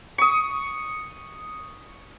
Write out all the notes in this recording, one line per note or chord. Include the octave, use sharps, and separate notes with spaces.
C#6 D#6